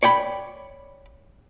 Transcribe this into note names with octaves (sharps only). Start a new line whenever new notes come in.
C#5 D5 G5 B5